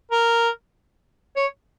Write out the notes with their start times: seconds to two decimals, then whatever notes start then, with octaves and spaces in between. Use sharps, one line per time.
0.11 A#4
1.36 C#5